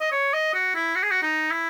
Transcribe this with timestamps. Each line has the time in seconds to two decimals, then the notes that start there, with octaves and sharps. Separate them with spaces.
0.01 D#5
0.12 C#5
0.33 D#5
0.54 F#4
0.75 E4
0.95 F#4
1.03 G#4
1.11 F#4
1.23 D#4
1.51 E4